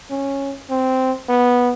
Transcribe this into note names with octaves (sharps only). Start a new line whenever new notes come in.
C#4
C4
B3